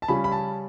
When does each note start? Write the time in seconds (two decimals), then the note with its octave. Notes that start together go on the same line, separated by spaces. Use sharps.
0.02 A5
0.08 C#3 G3 C#4 B5
0.24 B5
0.32 A5